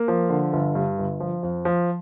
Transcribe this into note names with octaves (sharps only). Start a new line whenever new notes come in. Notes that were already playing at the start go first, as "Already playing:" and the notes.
Already playing: A#3
F3
D3
G1
G2
G1
F3
F2
F3